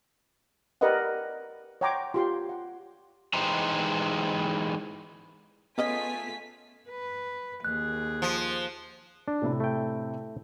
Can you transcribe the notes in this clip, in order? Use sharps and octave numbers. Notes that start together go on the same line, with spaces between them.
G4 A#4 B4 D5 D#5 F#5
C#5 F#5 G5 A#5 C6 D6
F4 G4 C6
F#5
E3 G#3 D#4 G4 C5 A#5
G#3 A3 B3 C#4 F4 D#5 G#5 B6
B4
D#2 G#4 F#6
F3
D4
A2 C3 E4
A3 G5